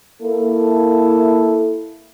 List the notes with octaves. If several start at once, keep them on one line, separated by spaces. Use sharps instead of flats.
A#3 E4 A4